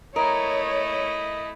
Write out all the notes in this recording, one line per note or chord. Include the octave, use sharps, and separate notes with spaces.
A3 E4 A#4 C#5 D#5